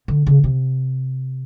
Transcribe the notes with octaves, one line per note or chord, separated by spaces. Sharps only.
D3
C#3
C3